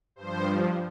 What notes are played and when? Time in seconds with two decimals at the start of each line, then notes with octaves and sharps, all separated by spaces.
0.16 G2 F3 C5